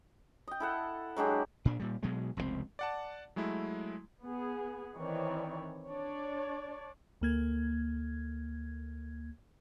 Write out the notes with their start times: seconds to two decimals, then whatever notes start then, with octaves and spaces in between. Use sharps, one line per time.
0.47 D#5 G5
0.60 E4 A4 F#5
1.16 F#3 G#3 D4 G4
1.65 A#2 D4
1.80 A#2 G3
2.03 B2 F#3 G#3
2.37 F1 C#2 A2 C4
2.79 D5 F#5 A5
3.36 F#3 G#3 A3 E4
4.22 B3 G#4
4.95 D#3 E3 C4 C#5 D5
5.87 D4 C#5 D5
7.21 D2 A#3 G#6